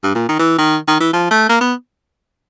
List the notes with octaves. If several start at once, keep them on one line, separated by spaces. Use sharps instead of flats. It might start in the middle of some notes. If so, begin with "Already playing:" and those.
G2
A#2
D#3
E3
D#3
D#3
E3
F3
A3
A#3
B3